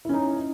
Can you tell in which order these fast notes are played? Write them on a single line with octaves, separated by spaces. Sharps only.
E4 C#4 D#4